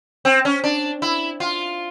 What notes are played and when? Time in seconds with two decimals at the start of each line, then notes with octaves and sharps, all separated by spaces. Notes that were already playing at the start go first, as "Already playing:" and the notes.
0.25 C4
0.45 C#4
0.64 D4
1.02 E4
1.40 F4